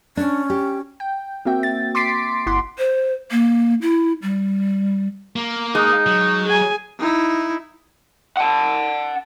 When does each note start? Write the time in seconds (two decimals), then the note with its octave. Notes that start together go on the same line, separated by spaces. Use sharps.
0.17 C#4 D4
0.50 G4
1.00 G5
1.45 A#3 C4 F#4 E5 G5
1.63 A6
1.95 C6 D6 A6 B6 C7 D7
2.46 G1 E4 F#5 C6 D6
2.78 C5
3.31 A#3
3.82 E4
4.22 G3
5.36 A#3
5.75 G#3 D#4
6.06 F#3
6.44 G#4 G#5
6.99 D#4 E4
8.37 F#5 A5